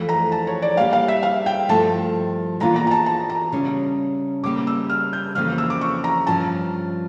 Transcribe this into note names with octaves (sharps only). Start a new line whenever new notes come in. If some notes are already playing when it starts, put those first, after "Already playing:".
Already playing: F2 E3 A3
A#5
A5
C#5
D5
G3 A#3 D4 G4 F5
F5
E5
F5
G5
G2 F3 A3 E4 A5
E2 E3 A#3 D4 F4 A#5
A#5
A#5
A5
A5
A#5
C#3 G3 C#4
C#3 G3 A#3 D6
E6
F6
G6
F2 C#3 E3 A#3 F6
E6
D6
C#6
A#5
G2 F3 C#4 A5